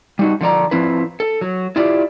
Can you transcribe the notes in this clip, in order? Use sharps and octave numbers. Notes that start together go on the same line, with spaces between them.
G3 D#4 F#4
D3 F3 D5 A#5
F3 C4 E4 B4
A4
F#3
E4 F4 G4 D5